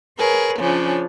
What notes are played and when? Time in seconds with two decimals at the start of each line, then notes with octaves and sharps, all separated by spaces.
0.18 G#4 A#4 B4 C#5
0.59 C#3 F3 C#4 D4